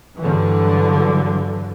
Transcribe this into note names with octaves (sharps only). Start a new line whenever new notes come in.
G2 D3 E3 F#3